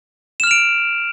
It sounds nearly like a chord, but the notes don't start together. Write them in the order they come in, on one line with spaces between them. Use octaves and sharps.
E7 F6 F7 D7